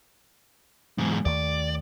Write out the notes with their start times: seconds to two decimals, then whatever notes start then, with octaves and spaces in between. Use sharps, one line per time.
0.98 E2 G#2
1.25 D#2 D#3 A3 D5